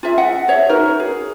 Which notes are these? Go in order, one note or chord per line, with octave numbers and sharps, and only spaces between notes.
F4 G#4 E5
D#5 E5 F#5
G#4 C#5 E5
D#4 F#4 A#4 B4
G#4